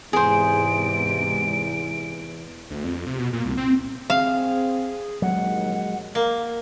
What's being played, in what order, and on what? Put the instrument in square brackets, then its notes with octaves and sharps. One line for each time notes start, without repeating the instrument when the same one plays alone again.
[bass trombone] E2 [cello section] G#2 C3 [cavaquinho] G#4 C5 [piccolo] D7
[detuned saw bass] D2
F2
C3
B2
A#2
C2
C4
[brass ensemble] C4 [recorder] G#4 [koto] F5
[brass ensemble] A#1 D#2 [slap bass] F#3 G#3 [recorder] F#5
[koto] A#3